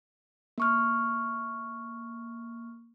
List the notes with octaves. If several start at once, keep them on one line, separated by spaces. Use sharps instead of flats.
A#3 C#6 F6